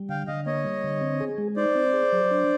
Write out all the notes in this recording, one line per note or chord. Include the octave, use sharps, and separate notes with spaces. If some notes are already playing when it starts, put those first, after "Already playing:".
Already playing: G3
D3 F5 G5
D3 D#5 F5
A#3 C#5 D#5
G3
D3
C4
G#4
G#3
D#4 C5 D5
C4
G#4
F#3
D4